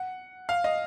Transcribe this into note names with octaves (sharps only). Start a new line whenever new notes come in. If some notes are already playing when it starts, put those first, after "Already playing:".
Already playing: F#5
F5
D#5